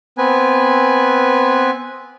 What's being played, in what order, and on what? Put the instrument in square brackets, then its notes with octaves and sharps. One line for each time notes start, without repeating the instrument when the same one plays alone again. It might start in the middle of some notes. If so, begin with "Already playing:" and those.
[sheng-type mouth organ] B3 C4 B4 G#5